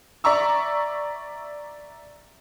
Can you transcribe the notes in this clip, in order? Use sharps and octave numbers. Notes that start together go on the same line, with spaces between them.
D5 E5 A#5 C#6 E6